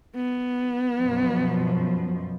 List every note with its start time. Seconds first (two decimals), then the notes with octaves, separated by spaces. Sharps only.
0.16 B3
0.98 F#2 B2 F3